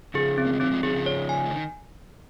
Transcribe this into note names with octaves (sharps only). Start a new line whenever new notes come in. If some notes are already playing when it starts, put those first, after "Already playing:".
C#3 F3 G#4
C4
A#3
G#3
D#3 F#3 C4
F3 G#3
D#3 F#3 G#4
C#3 F3
C#5
G#5
G#3
D#3